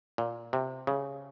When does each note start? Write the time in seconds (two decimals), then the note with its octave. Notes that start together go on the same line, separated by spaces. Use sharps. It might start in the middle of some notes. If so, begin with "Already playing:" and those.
0.18 A#2
0.53 C3
0.87 C#3